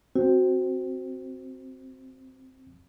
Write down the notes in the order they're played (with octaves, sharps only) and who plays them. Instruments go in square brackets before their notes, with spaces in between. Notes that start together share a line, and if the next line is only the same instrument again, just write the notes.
[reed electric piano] C4 [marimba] F#4